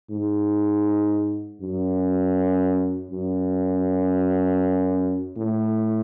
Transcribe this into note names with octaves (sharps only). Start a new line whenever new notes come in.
G#2
F#2
F#2
A2